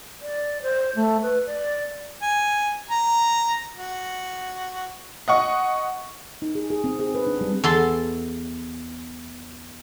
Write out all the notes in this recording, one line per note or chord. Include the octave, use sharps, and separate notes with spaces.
D5
C5
A3
B4
D5
G#5
A#5
F#4
D#5 F#5 C#6
D#4
G#4
G#4
C4
G#4
B4
D4
G3
E2 A4 A5 C6